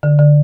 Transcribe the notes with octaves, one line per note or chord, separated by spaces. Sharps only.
D3
D3